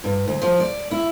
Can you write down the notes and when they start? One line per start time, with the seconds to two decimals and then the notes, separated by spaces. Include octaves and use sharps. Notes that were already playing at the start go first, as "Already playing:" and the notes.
0.04 G2
0.27 D2
0.42 F3
0.60 D5
0.91 E4